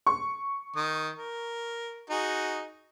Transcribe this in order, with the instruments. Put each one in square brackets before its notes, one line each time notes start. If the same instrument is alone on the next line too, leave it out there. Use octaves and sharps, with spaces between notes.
[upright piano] C#6
[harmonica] D#3 D#6
A#4
D#4 F#4 G#4